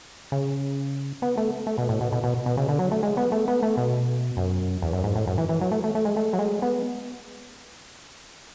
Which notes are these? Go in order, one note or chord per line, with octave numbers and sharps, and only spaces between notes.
C#3
B3
A3
A3
B2
A2
B2
B2
B2
B2
C#3
D3
F#3
A3
G#3
B3
A3
B3
A3
B2
F#2
E2
F#2
G#2
A2
F#2
E3
E3
F#3
A3
A3
A3
G#3
A3
F#3
G#3
B3